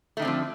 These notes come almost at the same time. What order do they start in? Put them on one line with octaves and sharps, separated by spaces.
A3 D#3 D3 C4 F3